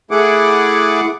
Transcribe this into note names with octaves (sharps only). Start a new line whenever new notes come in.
A3 E4 G#4 F#5 D6